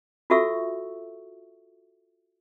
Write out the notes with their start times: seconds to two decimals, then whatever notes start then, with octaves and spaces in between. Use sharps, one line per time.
0.30 F4 F#4 A4 E5 C#6 E6